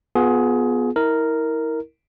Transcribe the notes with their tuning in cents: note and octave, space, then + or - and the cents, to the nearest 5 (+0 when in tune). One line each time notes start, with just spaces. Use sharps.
B3 +0 F4 +30 G#4 +20
E4 -35 A#4 -5